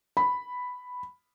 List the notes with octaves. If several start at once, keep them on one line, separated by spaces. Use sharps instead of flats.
B5